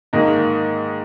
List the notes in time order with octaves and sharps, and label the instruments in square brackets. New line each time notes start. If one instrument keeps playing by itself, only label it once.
[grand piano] G#2 D#3 A#3 D#4